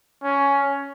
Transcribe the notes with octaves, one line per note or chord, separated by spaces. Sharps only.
C#4